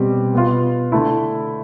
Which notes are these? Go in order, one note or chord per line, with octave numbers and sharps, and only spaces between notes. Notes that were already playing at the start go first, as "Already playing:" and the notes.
Already playing: B2 G3 C4 G4
B2 B3 F4
D3 A3 E4